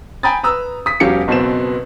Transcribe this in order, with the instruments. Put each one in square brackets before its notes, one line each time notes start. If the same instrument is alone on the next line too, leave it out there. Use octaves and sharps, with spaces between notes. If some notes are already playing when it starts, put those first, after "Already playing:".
[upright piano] G5 G#5 A#5 B5 D#6 A6
B4 A#5 D#6 E6
D#6 B6
E1 F#3 C#4 G4 F5 C#7
F#1 B2 B3 C4 E7